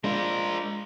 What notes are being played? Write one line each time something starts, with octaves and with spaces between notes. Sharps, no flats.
G#3 D4 F4 A#4 C5